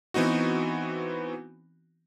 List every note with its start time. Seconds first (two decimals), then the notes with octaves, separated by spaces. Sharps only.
0.14 E3 B3 C4 D#4 F#4